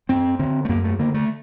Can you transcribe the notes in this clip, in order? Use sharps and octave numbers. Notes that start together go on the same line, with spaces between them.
F#2 C4
D3 C4
A3
F#2 A#3
A3
D3 A#3
A3